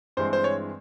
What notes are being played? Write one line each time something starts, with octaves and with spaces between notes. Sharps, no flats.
G2 E3 G#3 C4 C5
C5
C#5